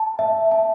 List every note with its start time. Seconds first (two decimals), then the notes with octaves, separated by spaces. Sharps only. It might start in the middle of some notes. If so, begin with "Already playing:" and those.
Already playing: A5
0.19 E5
0.51 A5